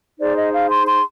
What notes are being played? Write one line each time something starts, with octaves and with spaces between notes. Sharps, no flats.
D#4 G#4 C5 D5
D#5
F5
C6
C6